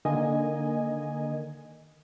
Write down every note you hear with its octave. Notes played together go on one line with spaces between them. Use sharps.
D3 D#3 A#3 D#5 G#5